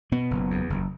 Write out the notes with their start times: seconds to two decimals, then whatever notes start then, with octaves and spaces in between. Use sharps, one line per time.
0.12 B2 B3
0.31 F#1
0.51 E2
0.70 F#1